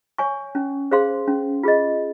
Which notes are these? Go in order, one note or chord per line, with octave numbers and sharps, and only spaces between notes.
C#5 G#5 C#6
C#4
G#4 C5 F5 C6
C#4
F4 G#4 D#5